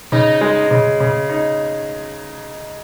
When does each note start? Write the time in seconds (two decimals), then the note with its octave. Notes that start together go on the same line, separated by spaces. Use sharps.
0.12 C#3 D#4
0.41 G#3
0.71 C#3
1.00 C#3
1.30 D#4